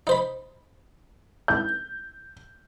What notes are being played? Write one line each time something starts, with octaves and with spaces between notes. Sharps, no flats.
D#4 C5 B5
G6